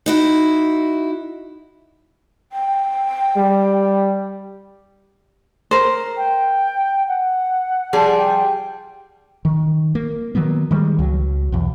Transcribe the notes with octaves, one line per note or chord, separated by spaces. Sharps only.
D#4 E4 F#4
G5
G3
A#4 C5
G5
F#5
F3 G3 G#4
G5
D#3
A#3
D#3 F#3 A#3 B3
D#3 G3 G#3
C#2 F#3
B1 E2